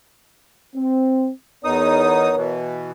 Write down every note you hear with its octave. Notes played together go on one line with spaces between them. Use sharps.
C4
E2 B3 D#4 A#4 C#5 D#6
B2 E3